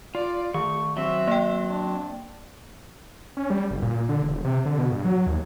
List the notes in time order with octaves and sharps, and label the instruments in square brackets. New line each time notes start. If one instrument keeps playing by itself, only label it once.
[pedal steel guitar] F4 [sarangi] D5
[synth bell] D#3 [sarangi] A3 [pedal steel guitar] C#6
[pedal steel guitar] F#3 C4 [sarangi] E5
[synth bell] A#3 G5
[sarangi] D4
[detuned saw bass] C#4
G3
F#1
A#2
D3
E1
C3
D3
B2
G2
F#3
D#2